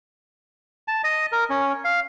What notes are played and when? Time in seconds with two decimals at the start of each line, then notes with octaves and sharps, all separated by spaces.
0.88 A5
1.04 D#5
1.32 A#4
1.50 C#4
1.85 F5